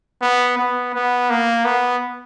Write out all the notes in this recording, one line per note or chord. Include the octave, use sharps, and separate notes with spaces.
B3
B3
B3
A#3
B3